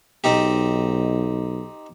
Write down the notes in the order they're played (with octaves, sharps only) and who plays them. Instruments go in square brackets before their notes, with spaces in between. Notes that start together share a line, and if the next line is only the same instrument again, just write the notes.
[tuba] B1 [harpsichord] C4 D#4 G4